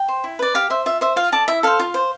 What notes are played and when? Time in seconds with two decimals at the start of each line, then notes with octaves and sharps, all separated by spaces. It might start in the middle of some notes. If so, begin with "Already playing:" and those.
Already playing: G5
0.08 C5
0.24 E4
0.39 B4 D5
0.55 G4 F5
0.70 C5 E5
0.86 F4 E5
1.01 C5 E5
1.16 F4 F5
1.32 A4 D5 A5
1.48 E4 E5
1.63 A4 C5 F5
1.79 F4
1.94 C5